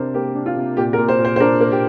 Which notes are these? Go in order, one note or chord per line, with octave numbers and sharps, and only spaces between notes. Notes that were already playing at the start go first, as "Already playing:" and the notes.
Already playing: C3 D4 A#4 C5
A#3 G4
D4
F4
C3
A#2 G4
A#4
A#2
C5
A#2
C5
C5
D4 A#4
A#3
G4